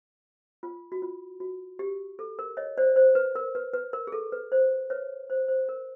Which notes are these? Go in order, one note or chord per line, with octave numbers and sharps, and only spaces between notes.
F4
F#4
F4
F#4
G4
A4
A#4
C#5 D#5
C5 D5
C5
B4
A#4
B4
B4
A#4
G#4
A4
B4
C5
B4 C#5
C5
C5
A#4